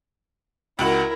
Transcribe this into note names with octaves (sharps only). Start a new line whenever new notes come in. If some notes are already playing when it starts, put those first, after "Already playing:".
C#2 E4 F#4 A#4 F#7